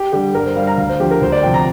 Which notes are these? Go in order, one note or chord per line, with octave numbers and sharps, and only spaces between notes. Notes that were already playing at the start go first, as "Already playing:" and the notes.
Already playing: G4
D3 G3 G4
G2 A#4
C5
G3 F5
A#5
D2 F5
C5
D3 F3 G4
A#4
D2 C5
D5
C3 F3 G5
A#5